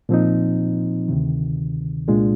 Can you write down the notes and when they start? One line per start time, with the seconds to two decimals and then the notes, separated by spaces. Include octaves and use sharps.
0.09 A#2 F3 C4 D#4
1.08 D2 C3 D#3
2.08 C2 A#2 G#3 D4 F4